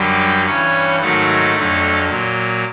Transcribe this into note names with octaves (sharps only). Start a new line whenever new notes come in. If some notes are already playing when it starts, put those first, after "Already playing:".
Already playing: F#2 D3 F#3 G3 G4
G2 E3 C#4 C#5
G#2 D#3 F#3 A3 A4
F2 D3 F#3
A#2 F#3